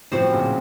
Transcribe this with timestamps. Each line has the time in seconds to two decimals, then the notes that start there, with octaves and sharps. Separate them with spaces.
0.12 A2 C3 F3 C4 F#4 C5
0.32 A#2 C#3